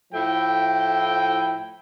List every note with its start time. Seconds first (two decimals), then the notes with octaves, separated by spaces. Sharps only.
0.13 A2 F3 A3 E4 G5